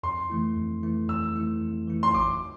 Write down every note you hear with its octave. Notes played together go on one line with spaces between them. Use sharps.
F2 C6
E3 A3 E4
F2
E3 A3 E4
F2 E6
E3 A3 E4
F2
E3 A3 E4
C6
G#1 D6